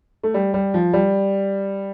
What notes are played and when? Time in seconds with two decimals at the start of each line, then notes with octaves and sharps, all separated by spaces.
0.23 A3
0.34 G3
0.54 G3
0.74 F3
0.93 G3